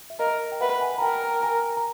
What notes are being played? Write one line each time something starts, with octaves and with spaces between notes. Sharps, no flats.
E5
A#4 D#5 F5
G5
B4 E5 F#5
F#5 G#5
A#5
A#4 G5 A5
G#5 A#5
A#5